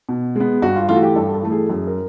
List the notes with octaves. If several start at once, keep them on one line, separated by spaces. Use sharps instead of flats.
B2
G#3 B3
G2 F#4
F4
E3 A3 F4
F#4
G4
G2 A4
A4
E3 A3
G#4
F#2 G#4
A#4